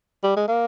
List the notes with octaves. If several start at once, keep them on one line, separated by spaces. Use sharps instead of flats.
G3
G#3
A#3